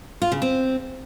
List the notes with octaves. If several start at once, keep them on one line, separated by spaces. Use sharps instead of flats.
F4
C#3
C4